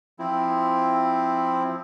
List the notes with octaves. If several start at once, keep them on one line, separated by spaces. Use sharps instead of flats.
F3 C4 E4